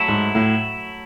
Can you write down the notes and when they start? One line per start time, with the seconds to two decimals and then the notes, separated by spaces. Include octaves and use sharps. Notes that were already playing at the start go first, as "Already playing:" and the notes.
Already playing: F#3 A3 E4
0.08 G#2
0.35 A2